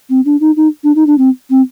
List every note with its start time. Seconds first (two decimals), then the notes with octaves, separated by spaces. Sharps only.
0.10 C4
0.25 D4
0.40 D#4
0.56 D#4
0.84 D4
0.95 D#4
1.07 D4
1.18 C4
1.50 C4